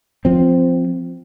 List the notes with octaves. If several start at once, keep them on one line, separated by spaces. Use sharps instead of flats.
F3 C4